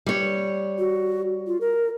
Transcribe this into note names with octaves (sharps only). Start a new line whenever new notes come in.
G3 C#5
F#4
F4
A#4